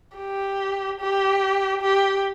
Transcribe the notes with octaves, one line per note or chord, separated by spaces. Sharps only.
G4
G4
G4